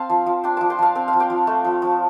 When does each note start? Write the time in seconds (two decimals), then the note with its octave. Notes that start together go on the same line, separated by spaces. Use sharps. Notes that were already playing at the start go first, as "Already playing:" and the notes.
Already playing: C4 F5 A5
0.10 F3
0.26 F3
0.44 D4 G5 C6
0.56 F3 A5 D6
0.70 G5 C6
0.79 F3 F5 A5
0.95 C4 G5
1.08 F5
1.13 F3
1.20 D5 G5
1.30 F3
1.47 A3
1.64 F3
1.82 F3